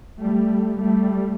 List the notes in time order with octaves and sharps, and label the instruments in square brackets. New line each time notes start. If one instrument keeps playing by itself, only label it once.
[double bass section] G3 A3
G3 A3